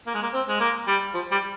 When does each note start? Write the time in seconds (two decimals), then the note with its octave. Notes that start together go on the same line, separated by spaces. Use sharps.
0.07 A#3
0.14 G#3
0.23 A#3
0.33 C4
0.48 G#3
0.60 A#3
0.88 G3
1.14 F3
1.31 G3